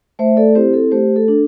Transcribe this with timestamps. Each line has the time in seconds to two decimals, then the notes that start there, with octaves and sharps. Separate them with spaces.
0.19 A3 C5 E5
0.37 A4 D5
0.55 C4 E4 G4 C5
0.73 A4
0.91 A3 G4 C5
1.16 A4
1.28 D4